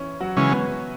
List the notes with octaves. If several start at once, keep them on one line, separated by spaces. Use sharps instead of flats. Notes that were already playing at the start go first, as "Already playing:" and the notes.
Already playing: E3 C#4 E4
F#3 F#4
C#3 E3 G#3 C#4
B3 B4